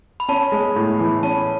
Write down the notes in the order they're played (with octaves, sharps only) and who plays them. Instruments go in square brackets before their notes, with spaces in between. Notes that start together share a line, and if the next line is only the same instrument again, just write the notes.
[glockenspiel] B5
[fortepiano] C#4 [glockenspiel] A5
[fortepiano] G#3
A2
E3
[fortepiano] C#4 [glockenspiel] A5